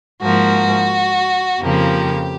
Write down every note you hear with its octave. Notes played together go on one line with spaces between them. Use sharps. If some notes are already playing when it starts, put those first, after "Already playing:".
G#2 F3 A#3 F#4
F2 C#3 F3 A#3 G4